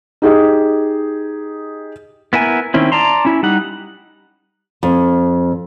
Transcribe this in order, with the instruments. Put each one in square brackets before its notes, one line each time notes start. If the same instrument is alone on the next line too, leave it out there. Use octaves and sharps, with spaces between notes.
[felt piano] D#4 G4 G#4 D#5
[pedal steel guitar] B3 E4 A#4 G#5
D#3 C4 C#4 E4
D5 A5 A#5 C6
C#4 E4
G3 D#4 F#5
[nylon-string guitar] F2